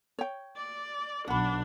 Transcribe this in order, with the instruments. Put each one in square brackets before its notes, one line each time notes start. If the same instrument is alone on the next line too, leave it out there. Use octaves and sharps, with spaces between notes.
[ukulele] C#5 G5
[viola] D5
[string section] B1 [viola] D4 [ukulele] F#5 B5